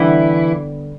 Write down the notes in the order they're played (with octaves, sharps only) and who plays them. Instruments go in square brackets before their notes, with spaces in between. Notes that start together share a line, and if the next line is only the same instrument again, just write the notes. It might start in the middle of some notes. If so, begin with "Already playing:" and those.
Already playing: [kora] D3 G3 B3 [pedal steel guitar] E3 E4